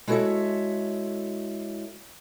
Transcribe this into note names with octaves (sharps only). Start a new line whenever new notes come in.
G#3 E4 F#4 A4 C#5 E5